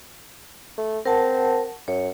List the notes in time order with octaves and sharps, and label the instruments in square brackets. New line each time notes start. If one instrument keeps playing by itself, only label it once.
[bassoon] A3
[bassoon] C4 [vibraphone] A#4 F#5 A5
[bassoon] F#2 [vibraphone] C#5